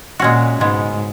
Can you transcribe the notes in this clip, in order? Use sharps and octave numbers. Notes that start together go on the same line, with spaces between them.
A#2 G#3 C#4 F#4
G#2 C#3 G#3 B3